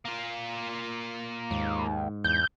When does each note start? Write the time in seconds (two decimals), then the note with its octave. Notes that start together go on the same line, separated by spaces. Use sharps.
0.05 A#3 F4
1.51 D#2 G#2
2.24 E2 G6